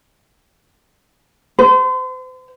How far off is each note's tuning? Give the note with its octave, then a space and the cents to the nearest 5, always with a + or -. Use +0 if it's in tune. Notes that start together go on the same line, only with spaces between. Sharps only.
C5 -40